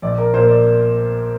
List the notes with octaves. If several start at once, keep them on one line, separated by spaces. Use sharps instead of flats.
A#1 D5
A#4
A#2 A#3 C5
D5